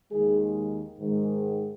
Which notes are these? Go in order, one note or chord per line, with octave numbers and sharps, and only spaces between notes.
D#2 D#3 G#3 G#4
G#2 D#3 G#3